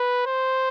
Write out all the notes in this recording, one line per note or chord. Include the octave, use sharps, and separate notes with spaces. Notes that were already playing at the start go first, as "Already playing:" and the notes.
Already playing: B4
C5